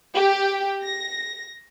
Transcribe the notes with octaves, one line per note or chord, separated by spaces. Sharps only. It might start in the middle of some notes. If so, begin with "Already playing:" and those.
G4
A#6